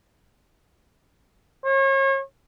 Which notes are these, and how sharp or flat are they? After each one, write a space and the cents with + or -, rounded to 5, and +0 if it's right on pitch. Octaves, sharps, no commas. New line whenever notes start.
C#5 -35